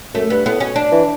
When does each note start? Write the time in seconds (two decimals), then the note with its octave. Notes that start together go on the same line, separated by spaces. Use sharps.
0.14 F#2 A3
0.30 G2 B3
0.45 A2 B3
0.60 B2 C#4
0.76 D4
0.92 E3